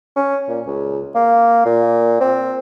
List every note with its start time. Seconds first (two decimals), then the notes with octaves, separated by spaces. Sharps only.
0.17 C#4
0.48 A#2
0.67 C#2
1.15 A#3
1.66 A#2
2.21 C4